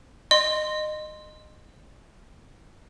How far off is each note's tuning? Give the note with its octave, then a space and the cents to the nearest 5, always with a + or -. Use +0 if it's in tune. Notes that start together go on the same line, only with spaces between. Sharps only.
D#5 -25 C6 +0